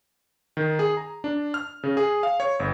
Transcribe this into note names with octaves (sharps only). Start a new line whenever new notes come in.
D#3
G#4
A#5
D4
F6
C#3
G#4
F5
C#5
G1